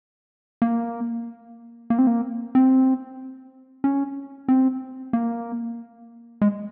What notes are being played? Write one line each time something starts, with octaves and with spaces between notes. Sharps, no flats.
A#3
A#3
C4
A#3
C4
C#4
C4
A#3
G#3